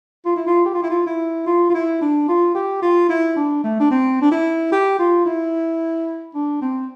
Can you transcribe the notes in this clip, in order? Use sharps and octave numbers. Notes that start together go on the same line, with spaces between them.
F4
E4
F4
G4
F4
E4
F4
E4
F4
F4
E4
D4
F4
G4
F4
E4
D4
A3
D4
C4
D4
E4
G4
F4
E4
D4
C4